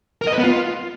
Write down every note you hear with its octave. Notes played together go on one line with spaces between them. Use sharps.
A#4
D#5
B4
B3
F4